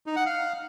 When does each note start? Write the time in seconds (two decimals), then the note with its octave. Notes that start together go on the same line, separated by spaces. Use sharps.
0.06 D#4
0.16 F#5
0.26 F5